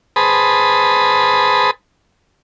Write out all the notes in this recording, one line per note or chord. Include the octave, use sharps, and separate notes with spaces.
G#4 B4 C5 A5 B5 D#6